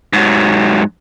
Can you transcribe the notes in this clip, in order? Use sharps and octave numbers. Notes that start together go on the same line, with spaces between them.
G#2 F#3